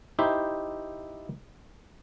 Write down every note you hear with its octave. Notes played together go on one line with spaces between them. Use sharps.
D#4 E4 G4 C5 E5